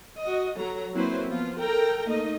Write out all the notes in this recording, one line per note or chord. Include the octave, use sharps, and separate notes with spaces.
F#4 D#5
F#3 A4 A#5
F#3 A#3 C4 E4 B4 C5
F3 B3 F4
A4 A#4 G5 A#5
A3 A#3 D#4 D#5